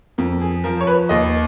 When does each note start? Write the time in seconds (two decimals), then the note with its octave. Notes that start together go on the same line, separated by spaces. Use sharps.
0.18 F2 A#4
0.41 G#4
0.64 F3 A#4
0.81 C#5
0.87 B4
1.09 D#2 D#5